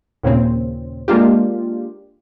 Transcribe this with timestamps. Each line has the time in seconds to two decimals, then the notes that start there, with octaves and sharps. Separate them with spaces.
0.23 D#2 A#2 C#3 C4
1.08 G#3 A#3 D4 F4 G4